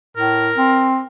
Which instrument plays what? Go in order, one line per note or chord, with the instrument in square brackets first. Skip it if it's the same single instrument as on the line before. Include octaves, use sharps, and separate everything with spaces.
[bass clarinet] A2 [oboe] A#4
[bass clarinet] C4